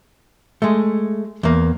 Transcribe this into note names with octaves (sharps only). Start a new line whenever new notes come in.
G#3 A3
E2 A#3